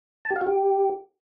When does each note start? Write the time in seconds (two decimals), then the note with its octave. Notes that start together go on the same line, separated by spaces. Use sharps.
0.25 A5
0.30 G4
0.36 F5
0.41 F#4
0.47 G4